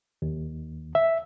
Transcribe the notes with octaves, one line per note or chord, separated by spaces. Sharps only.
D#2
E5